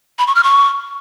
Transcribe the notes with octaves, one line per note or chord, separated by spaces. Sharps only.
B5
C#6
F6
C#6